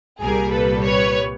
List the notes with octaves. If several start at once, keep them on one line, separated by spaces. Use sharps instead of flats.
C2 A#2 G3 G#4 A#4
A4 B4
B4 C#5